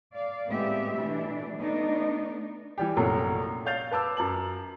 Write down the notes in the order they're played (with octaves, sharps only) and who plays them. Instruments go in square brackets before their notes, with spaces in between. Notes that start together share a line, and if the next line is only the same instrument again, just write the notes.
[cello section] D5 F5
A2 G#3 B3 C4 G4 E5
B2 E3 A3 D4
A3 B3 D4 D#4
[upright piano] E3 G3 G4
A#1 F#2 C3 F#3 A3
C#5 D5 F5 G6 A6 F7
B4 A5 D6 E6
F#2 A5 F#7